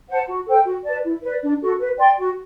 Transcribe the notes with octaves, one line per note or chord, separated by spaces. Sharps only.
C5 F#5 A5
F#4
A4 C5 G5
F#4
B4 D5 A5
E4
B4 D5
D4
F#4 A4
B4
D5 G5 C6
F#4